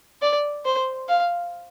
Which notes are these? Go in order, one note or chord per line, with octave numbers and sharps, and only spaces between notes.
D5
C5
F5